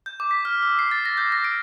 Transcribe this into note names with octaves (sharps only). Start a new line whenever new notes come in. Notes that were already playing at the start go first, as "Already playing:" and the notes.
G6
D6
B6
F6
E6
C7
A6
A#6
G6
A#6
D7